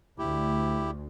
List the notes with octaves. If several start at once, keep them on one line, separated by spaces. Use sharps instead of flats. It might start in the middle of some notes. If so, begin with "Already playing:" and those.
D2 E4 G4